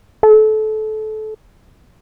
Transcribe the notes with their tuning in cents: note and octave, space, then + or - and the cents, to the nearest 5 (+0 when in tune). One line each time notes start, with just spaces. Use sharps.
A4 -25